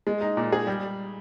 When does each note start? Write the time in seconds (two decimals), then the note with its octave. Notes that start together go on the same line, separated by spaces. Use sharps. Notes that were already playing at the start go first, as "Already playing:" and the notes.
0.07 G#3
0.21 D#4
0.37 A#2
0.52 G#4
0.67 G3